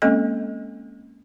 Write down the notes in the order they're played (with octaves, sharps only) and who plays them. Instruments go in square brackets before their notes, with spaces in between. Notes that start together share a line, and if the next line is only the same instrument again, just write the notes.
[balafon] G#3 A#3 C4 C#4 A4 D#5